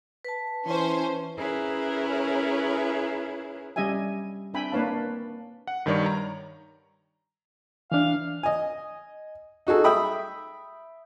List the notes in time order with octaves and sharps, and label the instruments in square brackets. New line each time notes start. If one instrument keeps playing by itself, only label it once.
[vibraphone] B4 A5
[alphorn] E3 [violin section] C#4 C5
[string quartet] C#4 E4 G#4 A#4 B4 C#5
[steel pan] G3 C#4 G4 D#5 E5 G#5
C4 D4 E5 G5 G#5 B5
A#3 D4 B4 C#5 F5 A5
[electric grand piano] F#5
G2 D#3 G3 C#5 D5
A#5
[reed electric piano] E3 D4 [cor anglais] F5
[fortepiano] D#5 G#5
D#4 F#4 G#4 A4
E5 G5 B5 D#6